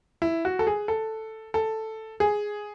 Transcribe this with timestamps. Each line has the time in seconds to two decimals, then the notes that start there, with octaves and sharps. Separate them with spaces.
0.22 E4
0.45 F#4
0.59 A4
0.67 G#4
0.88 A4
1.54 A4
2.20 G#4